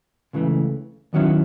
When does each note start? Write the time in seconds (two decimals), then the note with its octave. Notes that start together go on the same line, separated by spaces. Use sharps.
0.33 C#2 C#3 E3 A3
1.13 D#2 D#3 F#3 C#4 E4